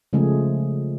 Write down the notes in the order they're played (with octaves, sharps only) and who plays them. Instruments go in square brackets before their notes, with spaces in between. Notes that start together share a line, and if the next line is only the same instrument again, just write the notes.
[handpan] C#3 F3 G#3 A3 G#4